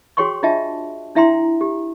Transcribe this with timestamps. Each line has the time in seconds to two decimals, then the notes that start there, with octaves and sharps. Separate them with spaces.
0.17 F#4 G#4 C#5 G5 C6 C#6
0.43 D4 F4 D#5 E5 G5 A5
1.15 D4 E4 E5 G5 A#5 C6
1.61 G4